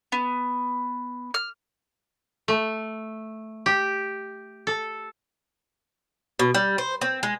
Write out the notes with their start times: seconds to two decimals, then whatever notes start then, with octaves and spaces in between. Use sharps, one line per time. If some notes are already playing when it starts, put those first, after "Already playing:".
0.12 B3
1.34 F6
2.48 A3
3.66 G4
4.67 A4
6.39 B2
6.54 G3
6.78 C5
7.01 C4
7.23 G#3